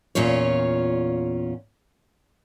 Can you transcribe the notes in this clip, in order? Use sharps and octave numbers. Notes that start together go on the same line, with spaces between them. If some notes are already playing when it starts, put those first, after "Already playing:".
E2 A#2 C#4 F4 C#5